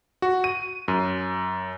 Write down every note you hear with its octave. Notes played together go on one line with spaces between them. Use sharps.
F#4
D#7
F#2